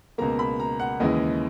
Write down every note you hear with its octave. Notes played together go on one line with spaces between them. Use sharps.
C#2 B2 A#3 A#5
B5
A#5
F#5
D#2 C#3 E3 G#3 D#5